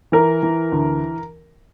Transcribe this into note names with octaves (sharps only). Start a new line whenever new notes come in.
E3 A#4
E3
D2